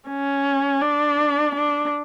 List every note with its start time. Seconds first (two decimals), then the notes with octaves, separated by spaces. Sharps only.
0.09 C#4
0.82 D4
1.55 D4